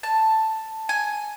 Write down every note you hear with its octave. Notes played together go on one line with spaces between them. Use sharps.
A5
G#5